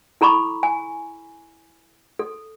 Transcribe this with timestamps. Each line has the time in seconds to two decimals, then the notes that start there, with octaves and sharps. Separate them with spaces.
0.21 E4 A4 A#5 B5 C#6 D6
0.63 G#5
2.19 A4